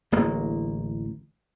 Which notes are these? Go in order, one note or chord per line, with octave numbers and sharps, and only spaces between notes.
D1 A1 A#3